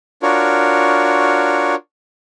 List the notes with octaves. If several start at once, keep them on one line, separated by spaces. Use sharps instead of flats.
D4 F4 F#4 A#4 C#5